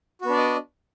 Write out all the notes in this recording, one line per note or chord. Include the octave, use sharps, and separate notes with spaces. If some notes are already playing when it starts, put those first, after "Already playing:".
B3 D4 F#4 D5 D#5